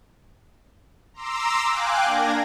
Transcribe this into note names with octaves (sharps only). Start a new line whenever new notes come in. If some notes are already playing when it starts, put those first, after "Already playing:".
A#5 C6 D6 E6
F5 G5 G#5 D6 F#6
A#3 D4 G#6 A#6